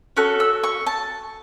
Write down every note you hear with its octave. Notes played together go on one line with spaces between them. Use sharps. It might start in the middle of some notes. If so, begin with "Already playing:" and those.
C#4 F#4 A4 F#6
E6
C#6
A5